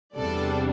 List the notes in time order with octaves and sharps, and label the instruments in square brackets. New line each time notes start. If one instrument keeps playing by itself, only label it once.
[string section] E2 C3 G3 D4 A4 D5